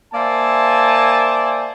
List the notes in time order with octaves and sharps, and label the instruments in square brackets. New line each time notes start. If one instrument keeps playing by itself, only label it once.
[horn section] A#3 C5 D5 E5 G#5 A5